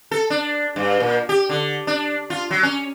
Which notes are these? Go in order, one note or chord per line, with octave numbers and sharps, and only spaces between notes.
A4
D4
G2
A#2
G4
D3
D4
F4
F#3
C#4